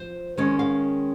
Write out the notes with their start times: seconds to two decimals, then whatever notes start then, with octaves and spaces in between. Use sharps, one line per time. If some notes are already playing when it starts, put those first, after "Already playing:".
Already playing: F3 C5
0.37 D#3 G#3 C#4
0.59 F5